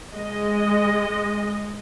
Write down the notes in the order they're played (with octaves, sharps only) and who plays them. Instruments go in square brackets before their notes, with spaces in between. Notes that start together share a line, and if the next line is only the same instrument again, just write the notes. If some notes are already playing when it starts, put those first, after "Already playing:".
[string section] G#3 D#5